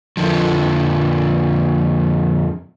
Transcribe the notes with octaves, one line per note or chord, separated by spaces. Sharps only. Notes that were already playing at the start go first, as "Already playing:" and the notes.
F2 D3 F3